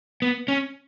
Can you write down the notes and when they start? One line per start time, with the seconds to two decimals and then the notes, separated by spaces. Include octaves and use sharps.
0.22 B3
0.48 C#4